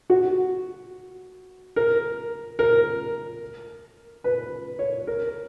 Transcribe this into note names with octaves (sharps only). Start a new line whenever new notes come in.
F#4
A#4
A#4
B4
C#5
A#4